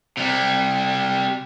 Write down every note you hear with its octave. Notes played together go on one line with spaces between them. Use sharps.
C3 G3